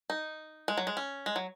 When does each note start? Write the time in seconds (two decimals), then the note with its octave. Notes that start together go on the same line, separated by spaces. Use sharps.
0.10 D#4
0.68 G#3
0.77 F#3
0.87 G#3
0.97 C#4
1.26 G#3
1.36 F#3